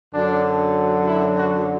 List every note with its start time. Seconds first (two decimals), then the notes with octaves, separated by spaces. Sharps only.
0.13 F#2 D3 F#3 D4
1.07 E4
1.38 F#4